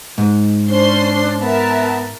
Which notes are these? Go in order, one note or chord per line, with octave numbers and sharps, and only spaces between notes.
G#2
C#4 D4 C5 C6
B3 A#4 E5 A5